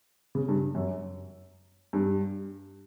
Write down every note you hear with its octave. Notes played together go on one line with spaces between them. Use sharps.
C#3
G2
F#2
G2